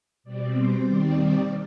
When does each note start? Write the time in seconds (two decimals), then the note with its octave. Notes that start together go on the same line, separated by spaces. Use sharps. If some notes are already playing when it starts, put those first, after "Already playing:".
0.24 B2 G3 C4 D5
0.54 C5
0.85 D#2 D#3 G3 C4 D5
1.15 D5